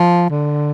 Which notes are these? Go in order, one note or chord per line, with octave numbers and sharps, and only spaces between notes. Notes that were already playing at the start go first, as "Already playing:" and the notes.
Already playing: F3
D3